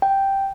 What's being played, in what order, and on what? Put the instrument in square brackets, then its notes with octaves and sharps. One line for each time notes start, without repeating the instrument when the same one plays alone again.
[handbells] G5